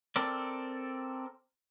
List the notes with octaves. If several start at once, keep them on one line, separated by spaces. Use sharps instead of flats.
C4 A4 A#4 D5